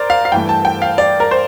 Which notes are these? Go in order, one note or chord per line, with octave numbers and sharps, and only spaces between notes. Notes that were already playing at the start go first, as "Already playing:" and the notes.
Already playing: A#4 C5 D5
F5
F5
G2 E3 A3 G5
A5
G5
F5
D5
A#4
C5